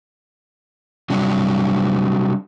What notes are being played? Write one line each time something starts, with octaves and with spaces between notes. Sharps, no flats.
C3 F#3 G3 D4 F#4